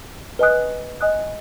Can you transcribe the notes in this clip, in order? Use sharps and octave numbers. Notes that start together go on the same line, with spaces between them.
B4 D#5 G#5 D#6 F#6
D#5 G#5 D#6 F#6